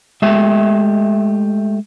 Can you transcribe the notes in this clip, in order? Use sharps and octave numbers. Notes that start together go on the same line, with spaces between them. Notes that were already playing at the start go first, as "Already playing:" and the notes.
G#3 A3 G4 E5